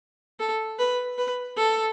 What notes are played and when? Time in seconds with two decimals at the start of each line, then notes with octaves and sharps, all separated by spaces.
0.40 A4
0.79 B4
1.18 B4
1.57 A4